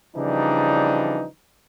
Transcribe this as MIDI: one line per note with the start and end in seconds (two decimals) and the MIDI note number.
0.16 1.26 49
0.16 1.26 52
0.16 1.26 53
0.16 1.26 55
0.16 1.26 62
0.16 1.26 63